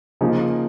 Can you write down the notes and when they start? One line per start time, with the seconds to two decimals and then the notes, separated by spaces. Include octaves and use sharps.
0.21 C#3 F3 A#3 D#4